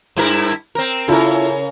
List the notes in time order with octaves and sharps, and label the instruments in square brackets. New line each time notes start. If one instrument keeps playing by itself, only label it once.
[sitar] G2 E4 A#4
C4 A#4
[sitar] C#3 A#4 [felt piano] E4 F4 A4